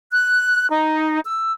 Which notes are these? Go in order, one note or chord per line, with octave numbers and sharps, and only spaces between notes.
F#6
D#4
E6